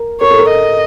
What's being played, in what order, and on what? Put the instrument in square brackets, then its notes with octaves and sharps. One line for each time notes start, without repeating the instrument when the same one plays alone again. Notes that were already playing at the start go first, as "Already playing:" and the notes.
Already playing: [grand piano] A#4
[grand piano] A#4 [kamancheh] C#5
[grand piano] A4
A#4
[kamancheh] D#5